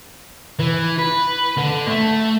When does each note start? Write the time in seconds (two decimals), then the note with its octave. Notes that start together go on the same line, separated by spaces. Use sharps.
0.59 E3
0.98 B4
1.57 D3
1.88 A3